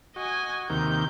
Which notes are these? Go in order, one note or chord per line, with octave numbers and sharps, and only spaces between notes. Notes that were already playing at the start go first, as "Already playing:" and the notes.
F#4 D#5 G#5
D#2 C3 D#3 G6